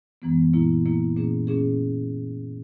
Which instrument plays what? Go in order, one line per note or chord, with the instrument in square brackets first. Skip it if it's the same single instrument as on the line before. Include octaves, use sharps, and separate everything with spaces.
[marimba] F#2 E3 G#3 B3
A#2 A#3 E4
A#2 A#3 E4
A#2 A#3 C#4 G#4
A#2 A#3 C#4 G#4